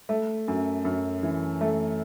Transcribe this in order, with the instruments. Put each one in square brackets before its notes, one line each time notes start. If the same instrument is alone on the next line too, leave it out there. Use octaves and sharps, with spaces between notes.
[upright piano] A3
F#2
F#2
E3
A3